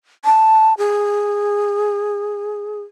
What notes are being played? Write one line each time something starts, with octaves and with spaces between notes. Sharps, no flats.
A5
G#4